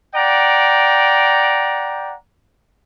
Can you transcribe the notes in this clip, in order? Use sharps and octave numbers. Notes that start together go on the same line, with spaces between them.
D5 F#5 G5 A#5